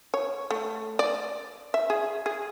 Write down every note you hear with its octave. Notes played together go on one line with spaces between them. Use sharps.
C#5
A3
D5
E5
G#4
G#4